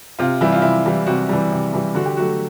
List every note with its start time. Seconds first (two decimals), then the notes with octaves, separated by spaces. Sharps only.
0.19 C3 F4
0.41 E3 G3 E4
0.52 F4
0.62 C3 E4
0.86 E3 G3
1.06 C3 F#4
1.29 E3 G3
1.52 C3
1.74 E3 G3
1.95 D3 F#4
2.06 G4
2.17 F#3 A3 F#4